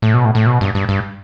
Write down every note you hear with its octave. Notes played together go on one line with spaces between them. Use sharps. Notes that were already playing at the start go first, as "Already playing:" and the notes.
A2
B2
A2
A2
B2
G2
G2
G2